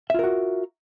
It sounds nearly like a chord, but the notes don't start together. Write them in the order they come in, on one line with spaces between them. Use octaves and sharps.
E5 F4 A#4 F#4